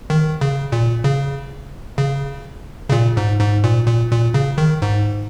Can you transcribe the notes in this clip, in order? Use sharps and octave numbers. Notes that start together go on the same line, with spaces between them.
D#3
C#3
A#2
C#3
C#3
C#3
A#2
G#2
G#2
A#2
A#2
A#2
C#3
D#3
G#2